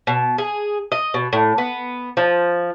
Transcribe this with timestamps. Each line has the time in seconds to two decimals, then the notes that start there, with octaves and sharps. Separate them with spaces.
0.07 B2
0.38 G#4
0.92 D#5
1.14 B2
1.33 A2
1.58 B3
2.17 F3